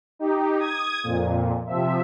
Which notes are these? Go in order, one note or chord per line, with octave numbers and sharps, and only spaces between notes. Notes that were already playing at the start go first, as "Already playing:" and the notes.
D#4 G4
D#6 G#6
F2 A#2
C3 F3 E5